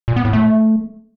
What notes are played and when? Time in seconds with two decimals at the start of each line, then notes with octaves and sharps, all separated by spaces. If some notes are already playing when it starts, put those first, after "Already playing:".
0.08 A#2
0.16 B3
0.25 A2
0.33 A3